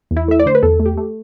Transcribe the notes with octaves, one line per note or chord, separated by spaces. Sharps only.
E2
E4
A3 E5
D5
D3 C5
B4
E2 A4
A3
G4
A3